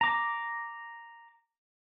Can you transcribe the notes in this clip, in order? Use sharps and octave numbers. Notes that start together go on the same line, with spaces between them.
A#5 D6